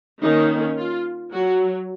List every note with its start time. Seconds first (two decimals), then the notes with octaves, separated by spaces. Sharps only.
0.22 D#3 A#3 C#4 D#4
0.78 F4
1.33 F#3 F#4